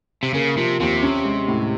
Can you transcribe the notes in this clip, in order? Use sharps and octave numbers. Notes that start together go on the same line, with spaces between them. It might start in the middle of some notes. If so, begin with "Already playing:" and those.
C3
C#3 A#3
C3 F3
D#2 C3
C#4
G#3
A2